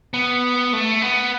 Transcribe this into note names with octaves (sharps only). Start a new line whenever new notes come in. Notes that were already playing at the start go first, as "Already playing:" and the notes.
B3
A3
B3